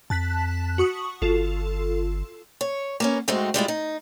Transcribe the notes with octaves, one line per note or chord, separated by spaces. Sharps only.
F2 A5 F#6 B6
F#4 C#6 D#6
G1 F4 A4
C#5
A#3 B3 C#4
G#2 G#3 A3 C4 D#4 F#4
G3 G#3 E4 F4
D#4